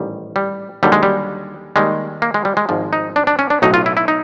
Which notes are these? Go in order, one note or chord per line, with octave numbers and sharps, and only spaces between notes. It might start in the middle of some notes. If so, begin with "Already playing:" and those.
Already playing: A1 G#2 D#3 G3
G3
D#2 D3 F#3 G3
G#3
G3
D#2 D#3 G3 G#3
A#3
G#3
G3
G#3
G#1 G#2 F3
D#4
D4
D4
C#4
D4
B1 A2 F#3 D#4
F4
E4
E4
D#4